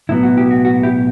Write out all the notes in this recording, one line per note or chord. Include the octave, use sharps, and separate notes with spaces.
B1 A2 F#3 B3 E4
F#4
E4 G4
F#4
F#4
E4 G4